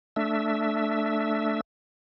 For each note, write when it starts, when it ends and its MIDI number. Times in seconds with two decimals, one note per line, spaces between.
0.16 1.61 57
0.16 1.61 62
0.16 1.61 76